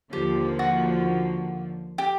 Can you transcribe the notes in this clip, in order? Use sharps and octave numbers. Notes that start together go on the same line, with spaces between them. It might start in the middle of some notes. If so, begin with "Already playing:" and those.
D#2 D3 F3 A#3 G4
F#4
G4